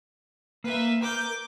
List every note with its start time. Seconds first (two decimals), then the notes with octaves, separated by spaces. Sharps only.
0.64 A#3 B4 E5
1.02 A#4 D6 G6